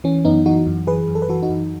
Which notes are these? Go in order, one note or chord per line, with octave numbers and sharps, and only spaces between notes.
E3 C#4
F#2 B3 D#4
E3 D#4 F#4
F#2
E3 G#4 B4
F#2
A4
B4
E3 F#4 A4
D#4 F#4
F#2